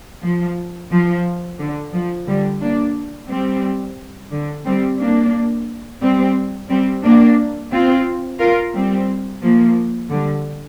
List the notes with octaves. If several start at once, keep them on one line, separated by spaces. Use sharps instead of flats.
F3
F3
D3
F3
D3 G3
A#3 D4
G3 C4
D3
G3 C4
A#3 D4
G3 C4
G3 C4
A#3 D4
C4 F4
F4 A#4
G3 C4
F3 A#3
D3 G3